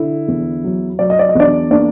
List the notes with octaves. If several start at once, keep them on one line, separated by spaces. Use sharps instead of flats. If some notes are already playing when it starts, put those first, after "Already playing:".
Already playing: D3 E4
E2
F#3
F#3 D5
D#5
D5
D#5
E2 D4 D5
A#3 D4 D5